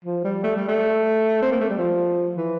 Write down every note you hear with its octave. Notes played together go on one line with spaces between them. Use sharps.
F3
G3
A3
G3
A3
C4
A#3
A3
G3
F3
E3